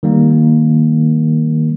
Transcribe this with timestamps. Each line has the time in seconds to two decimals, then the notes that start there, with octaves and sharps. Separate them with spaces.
0.03 D#3 G3 A#3